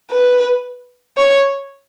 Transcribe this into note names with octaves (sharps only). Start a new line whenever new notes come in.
B4
C#5